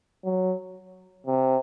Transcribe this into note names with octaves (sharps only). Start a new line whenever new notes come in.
F#3
C3